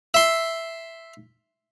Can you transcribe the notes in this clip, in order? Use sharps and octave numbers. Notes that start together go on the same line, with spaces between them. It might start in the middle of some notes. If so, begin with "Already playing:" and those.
E5 C6